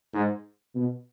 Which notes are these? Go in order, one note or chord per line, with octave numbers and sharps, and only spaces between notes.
G#2
B2